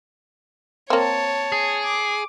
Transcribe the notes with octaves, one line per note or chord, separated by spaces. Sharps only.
A#3 C4 C#5 A5
G#4
D6